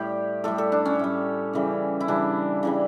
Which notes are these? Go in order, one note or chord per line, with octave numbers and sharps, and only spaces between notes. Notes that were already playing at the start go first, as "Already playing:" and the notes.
Already playing: A2 G3 G4
A2 G3 A4
A4
D4
C#4
A2 G3
C#3 E3 G3
E4
C#3 E3 G3 D4
C#3 E3 G3